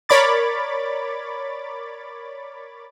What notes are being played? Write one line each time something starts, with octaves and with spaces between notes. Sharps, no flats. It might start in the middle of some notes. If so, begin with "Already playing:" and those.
A#4 C#5 D5 B5 D6 A6